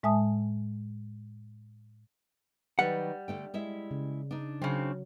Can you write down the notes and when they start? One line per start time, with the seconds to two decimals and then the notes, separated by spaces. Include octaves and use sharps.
0.03 A2 G#3 E5 G#5 A5 D#6
2.79 D#3 F#3 G3 B4 F#5
3.28 D3 A3 G5
3.54 G#3 E4 E5
3.91 C#3
4.31 D4 D#4
4.62 C#3 F#3 C4